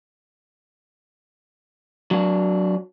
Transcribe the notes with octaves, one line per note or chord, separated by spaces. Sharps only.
F#3 D4